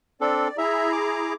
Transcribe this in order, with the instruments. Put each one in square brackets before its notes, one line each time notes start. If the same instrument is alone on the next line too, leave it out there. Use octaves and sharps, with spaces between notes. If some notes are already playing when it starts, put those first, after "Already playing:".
[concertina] C4 D4 A4 [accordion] D5
[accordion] E4 G#4 A#5 [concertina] E5
[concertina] D6